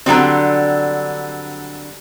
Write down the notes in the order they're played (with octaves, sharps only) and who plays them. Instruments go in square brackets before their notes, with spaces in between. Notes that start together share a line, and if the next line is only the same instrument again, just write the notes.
[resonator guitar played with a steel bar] D3 F#3 G3 C4